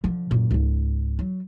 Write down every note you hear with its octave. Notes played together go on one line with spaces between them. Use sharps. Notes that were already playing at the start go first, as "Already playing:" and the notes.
D3 F3
F#2 A#2
C#2 G#2
F#3